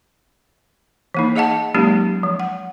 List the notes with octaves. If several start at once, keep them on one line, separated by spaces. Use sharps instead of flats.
E3 A#3 D#4
G#4 D#5 F5 F#5 A5
F#3 G#3 A#3 C#4 D#4 G4
F3
F#5